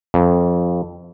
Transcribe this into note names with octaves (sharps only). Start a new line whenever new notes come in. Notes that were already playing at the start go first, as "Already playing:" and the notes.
F2